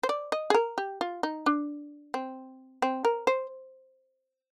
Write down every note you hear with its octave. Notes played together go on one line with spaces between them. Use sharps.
C5
D5
D#5
G#4
A#4
G4
F4
D#4
D4
C4
C4
A#4
C5